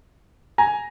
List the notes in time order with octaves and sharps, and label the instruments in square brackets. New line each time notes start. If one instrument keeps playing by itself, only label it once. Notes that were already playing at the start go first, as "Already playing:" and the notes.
[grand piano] G#5 A#5